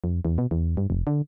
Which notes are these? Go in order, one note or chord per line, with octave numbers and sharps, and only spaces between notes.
F2
E2
B2
E2
G2
F1
D3